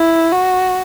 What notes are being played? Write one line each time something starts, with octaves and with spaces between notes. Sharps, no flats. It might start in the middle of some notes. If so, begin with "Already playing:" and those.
Already playing: E4
F#4